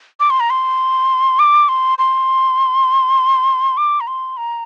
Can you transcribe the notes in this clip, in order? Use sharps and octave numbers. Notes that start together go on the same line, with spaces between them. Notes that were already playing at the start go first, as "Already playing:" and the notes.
D6
C6
A#5
C6
D6
C6
C6
D6
A#5
C6
A#5